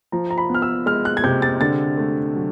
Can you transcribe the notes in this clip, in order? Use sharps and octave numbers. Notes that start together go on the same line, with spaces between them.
F3 A#5
A#5
B5
B3
F6
E6
G#3 F6
F#6
G#6
C3 G6
A6
D3 A6
A3
F#3